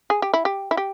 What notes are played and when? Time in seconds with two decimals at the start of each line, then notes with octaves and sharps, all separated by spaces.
0.10 G#4
0.22 G4
0.34 E4
0.45 G4
0.71 E4
0.77 G4